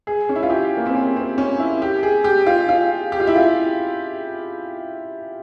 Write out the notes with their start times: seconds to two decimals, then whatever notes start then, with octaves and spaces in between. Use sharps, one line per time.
0.07 G#4
0.29 C#4
0.36 E4
0.43 F4
0.50 G4
0.77 A#3
0.86 C4
0.94 C#4
1.16 C4
1.38 C#4
1.60 E4
1.82 G4
2.03 G#4
2.24 G4
2.46 F4
2.69 F4
3.12 G4
3.20 F4
3.27 E4
3.36 F4